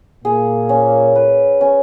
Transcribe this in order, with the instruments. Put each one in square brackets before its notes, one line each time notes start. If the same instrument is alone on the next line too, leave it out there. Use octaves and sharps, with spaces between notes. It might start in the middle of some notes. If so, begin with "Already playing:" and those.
[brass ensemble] A#2 A#3 [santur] G#4
[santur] C#4
B4
C#4